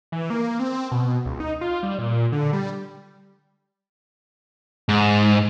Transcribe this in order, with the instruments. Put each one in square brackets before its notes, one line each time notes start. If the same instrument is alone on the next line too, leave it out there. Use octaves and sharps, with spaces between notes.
[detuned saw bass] E3
A#3
C4
B2
C#2
D#4
F4
G3
A#2
D3
G3
[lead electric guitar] G#2